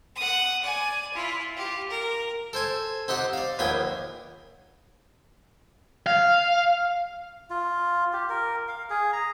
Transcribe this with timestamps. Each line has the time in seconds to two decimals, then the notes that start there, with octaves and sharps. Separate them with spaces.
0.16 F#5 D#6
0.63 D5 G#5
1.13 E4 F4
1.55 F4 G4
1.90 A#4
2.53 A4 C5 G#5
3.08 C4 D#4 G4 F#5
3.33 D5 F5
3.59 A#1 D#2 A#2 B3 G#4 G5
6.06 F5
7.50 F4
8.13 G4
8.29 A#4
8.68 F5
8.90 G#4
9.13 A#5